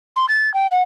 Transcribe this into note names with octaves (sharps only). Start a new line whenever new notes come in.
C6
A6
G5
F#5